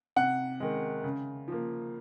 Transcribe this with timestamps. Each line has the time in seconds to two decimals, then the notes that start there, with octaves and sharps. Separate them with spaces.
0.16 C3 F#5
0.60 D#3 G#3
1.04 C#3
1.48 F3 A#3